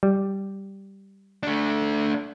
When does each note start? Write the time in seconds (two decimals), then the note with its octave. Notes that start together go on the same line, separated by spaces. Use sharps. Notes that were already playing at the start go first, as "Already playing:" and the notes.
0.03 G3
1.43 A3 D4